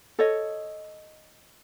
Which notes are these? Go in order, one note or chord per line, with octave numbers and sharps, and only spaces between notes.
A4 C#5 D#5